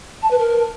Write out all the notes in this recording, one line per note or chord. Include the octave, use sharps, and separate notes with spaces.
A5
B4
A#4